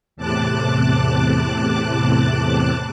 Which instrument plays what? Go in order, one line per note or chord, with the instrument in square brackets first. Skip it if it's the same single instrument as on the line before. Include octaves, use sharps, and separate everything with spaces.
[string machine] E2 A2 C3 A5 D6 F#6